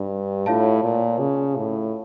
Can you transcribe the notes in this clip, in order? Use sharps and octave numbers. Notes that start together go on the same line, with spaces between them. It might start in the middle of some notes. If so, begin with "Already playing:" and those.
Already playing: G2
A2 F4 C#5 F5 A5
A#2
C#3
A2